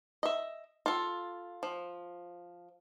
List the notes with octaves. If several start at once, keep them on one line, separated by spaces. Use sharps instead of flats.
D#5 E5
F4 A4
F3